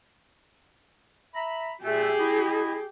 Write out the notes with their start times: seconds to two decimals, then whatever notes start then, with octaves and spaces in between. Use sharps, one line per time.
1.34 E5 A#5 B5
1.84 A#2 A3 G4 G#4 E5
2.18 E4 D#5